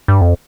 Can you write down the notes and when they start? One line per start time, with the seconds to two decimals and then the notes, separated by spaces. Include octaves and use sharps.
0.08 G2
0.21 F2